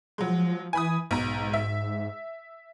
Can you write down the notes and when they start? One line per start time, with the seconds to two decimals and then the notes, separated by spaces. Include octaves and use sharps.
0.18 F3 F#3 G#3
0.73 E3 G#5 B5 D#6
1.11 B1 G#2 A#5
1.53 E5